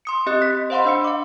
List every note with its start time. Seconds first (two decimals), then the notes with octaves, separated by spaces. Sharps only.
0.05 C6 D#6 C#7
0.26 C4 G4 D#5 C6 F#6 C#7
0.42 B6
0.70 C5 D#5 F5 F#5 B5 C6
0.85 D4 E6 C#7
1.04 F5 D6